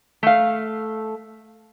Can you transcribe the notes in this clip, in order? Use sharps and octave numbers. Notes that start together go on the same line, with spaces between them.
A3 F5